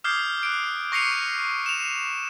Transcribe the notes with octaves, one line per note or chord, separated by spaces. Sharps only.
D6 D#6 F6 G6 G#6 C7
F#6 D7
C#6 A#6 C7 C#7 D#7 F7
E7 F7